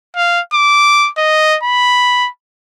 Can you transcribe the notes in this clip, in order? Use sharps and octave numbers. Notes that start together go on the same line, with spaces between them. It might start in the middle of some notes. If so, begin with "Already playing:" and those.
F5
D6
D#5
B5